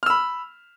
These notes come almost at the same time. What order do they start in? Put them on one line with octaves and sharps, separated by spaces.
F6 E6 B5